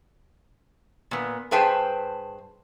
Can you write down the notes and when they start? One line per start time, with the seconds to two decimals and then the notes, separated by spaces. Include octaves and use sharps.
1.11 A#2 B3
1.51 G2 G#4 B4 C5 G5 A5